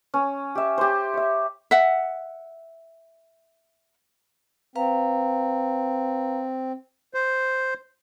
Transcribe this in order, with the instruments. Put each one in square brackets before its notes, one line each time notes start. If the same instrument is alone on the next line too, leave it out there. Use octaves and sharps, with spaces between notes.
[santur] C#4
G4 E5
G4 C5
C#5 E5
[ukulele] E5 F#5
[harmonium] C4 [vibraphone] B4 F5 A#5
[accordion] C5